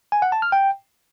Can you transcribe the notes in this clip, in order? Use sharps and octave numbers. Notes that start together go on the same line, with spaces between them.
G#5
F#5
A5
F6
G5